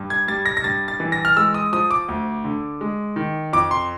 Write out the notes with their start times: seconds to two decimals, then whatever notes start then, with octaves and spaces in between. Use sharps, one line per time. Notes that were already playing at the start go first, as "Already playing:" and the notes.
Already playing: G2
0.10 G#6
0.27 G3 A6
0.46 A#6
0.57 A#6
0.64 G2 A6
0.88 A6
1.00 E3
1.12 A#6
1.25 F6
1.37 G#3 E6
1.54 D#6
1.73 F3 D#6
1.91 D6
2.08 D2
2.44 D3
2.81 G#3
3.16 D#3
3.53 F2 D6
3.71 C6